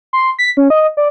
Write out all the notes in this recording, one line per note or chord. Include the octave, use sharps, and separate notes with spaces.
C6
B6
C#4
D#5
D5